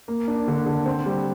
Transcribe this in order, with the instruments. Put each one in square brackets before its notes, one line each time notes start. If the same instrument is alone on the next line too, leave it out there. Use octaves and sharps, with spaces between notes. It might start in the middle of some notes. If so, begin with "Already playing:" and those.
[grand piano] A#3
D4
D3
D3
C4
G3